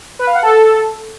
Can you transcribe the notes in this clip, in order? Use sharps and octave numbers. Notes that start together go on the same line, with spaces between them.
B4
F5
F#5
A4